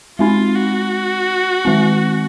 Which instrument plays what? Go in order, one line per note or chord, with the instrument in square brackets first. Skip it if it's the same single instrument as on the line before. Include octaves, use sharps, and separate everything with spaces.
[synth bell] G#3 C4 D#4 [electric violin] F4
[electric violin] F#4
[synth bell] D#3 G#3 C4